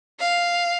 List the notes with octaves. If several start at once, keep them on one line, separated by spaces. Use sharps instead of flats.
F5